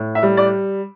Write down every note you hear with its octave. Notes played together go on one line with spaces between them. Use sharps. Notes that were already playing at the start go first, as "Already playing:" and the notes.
Already playing: A2
E5
G3
D5